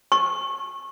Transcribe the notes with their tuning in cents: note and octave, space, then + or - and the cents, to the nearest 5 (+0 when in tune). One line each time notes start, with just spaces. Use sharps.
C#6 -25